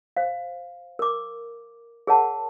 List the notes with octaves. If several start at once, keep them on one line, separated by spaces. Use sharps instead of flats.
C5 F5
A#4 D6
G#4 A#4 C#5 F#5 A5